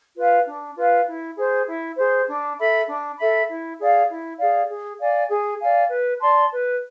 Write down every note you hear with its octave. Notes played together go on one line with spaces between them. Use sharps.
F4 B4 F5
D4
F4 B4 F5
E4
G#4 C5
E4
G#4 C5
D4
A4 E5 B5
D4
A4 E5 B5
E4
G#4 D5 F5
E4
G#4 D5 F5
G#4
D5 F5 G#5
G#4
D5 F5 G#5
B4
D5 A5 C6
B4